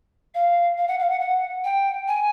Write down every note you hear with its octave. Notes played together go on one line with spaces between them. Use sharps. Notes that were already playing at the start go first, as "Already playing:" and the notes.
F5
F5
F#5
F5
F#5
F#5
G5
G#5